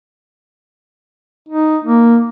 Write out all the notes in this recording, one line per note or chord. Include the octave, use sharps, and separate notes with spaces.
D#4
A#3